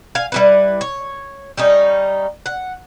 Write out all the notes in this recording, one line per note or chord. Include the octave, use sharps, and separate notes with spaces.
F5 G#5
G3 E4 B4
C#5
G3 C#4 D#4
F#5